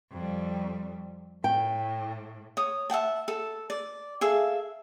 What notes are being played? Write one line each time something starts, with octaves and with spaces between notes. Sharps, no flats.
F2 G3
A2 G5
C#5 D#6
E5 F#5 G5 A5
A4
D5
G#4 A4 E5 F5